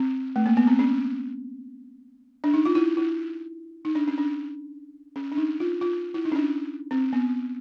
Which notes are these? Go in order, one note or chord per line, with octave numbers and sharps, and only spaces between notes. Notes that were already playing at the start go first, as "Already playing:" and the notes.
Already playing: C4
A3
A#3
B3
C4
C#4
D4
D#4
F4
E4
E4
D#4
D4
C#4
D4
C#4
D4
D#4
F4
F4
E4
D#4
C#4
D4
C4
B3